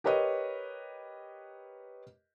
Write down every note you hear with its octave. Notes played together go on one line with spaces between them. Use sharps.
G4 A#4 B4 C#5 D#5